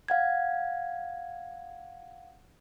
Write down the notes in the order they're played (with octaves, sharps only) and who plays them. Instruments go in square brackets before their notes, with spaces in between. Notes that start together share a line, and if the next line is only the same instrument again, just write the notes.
[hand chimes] F5 F#5 G#6